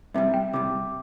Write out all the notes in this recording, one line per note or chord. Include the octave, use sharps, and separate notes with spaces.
C2 C3 G3 E5
G5
C2 C3 G3 D6